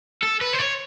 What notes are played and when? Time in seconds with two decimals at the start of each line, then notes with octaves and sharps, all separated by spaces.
0.23 A4
0.41 B4
0.54 C5
0.59 C#5